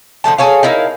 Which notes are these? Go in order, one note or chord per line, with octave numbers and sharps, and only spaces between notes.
D3 F3 A3 A5
G#4 A4 C#5 F5
D#4 E4 A#4 F5